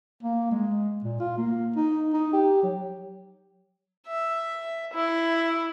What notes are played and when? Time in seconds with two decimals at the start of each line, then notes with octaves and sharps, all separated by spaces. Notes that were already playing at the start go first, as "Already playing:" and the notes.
0.23 A#3
0.51 G#3
1.04 A#2
1.19 F4
1.37 A#3
1.76 D#4
2.13 D#4
2.33 G4
2.62 F#3
4.07 E5
4.93 E4